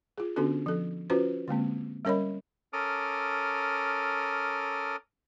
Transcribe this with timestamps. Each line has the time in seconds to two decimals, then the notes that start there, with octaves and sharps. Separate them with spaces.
0.18 F4 G#4
0.36 D3 B3 C#4 D4 F#4 A4
0.66 F3 A4
1.10 C#4 F4 F#4 B4 C5
1.48 D3 G#3 A#3 C4
2.05 G3 C#4 A#4 C#5 D#5 B5
2.73 C#4 A4 A#4 D6 D#6 F6